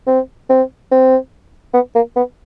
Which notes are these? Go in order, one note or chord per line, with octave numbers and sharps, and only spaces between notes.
C4
C4
C4
B3
A#3
B3